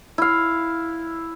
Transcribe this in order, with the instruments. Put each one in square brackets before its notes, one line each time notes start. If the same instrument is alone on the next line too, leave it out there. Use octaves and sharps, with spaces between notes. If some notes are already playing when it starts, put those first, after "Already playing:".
[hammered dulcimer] E4 F5